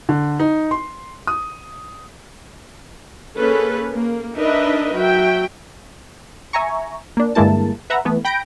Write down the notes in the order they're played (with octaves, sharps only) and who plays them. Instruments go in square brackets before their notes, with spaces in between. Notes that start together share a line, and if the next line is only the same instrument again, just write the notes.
[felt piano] D3
D#4
C6
D#6
[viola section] A#3 C#4 G#4 A4 B4
A#3
D4 D#4 A#4 B4 D#5 E5
F#3 E5 G5
[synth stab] E5 G#5 A#5 C#6
A#3 D4
G2 D3 G#3 A#3 E4 A5
B4 E5 F#5 A#5
E3 A3 B3
G5 B5 G6 A#6 D7